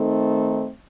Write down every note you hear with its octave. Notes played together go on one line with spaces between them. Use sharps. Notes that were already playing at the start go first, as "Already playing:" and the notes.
Already playing: D#3 A3 C4 D#4 A4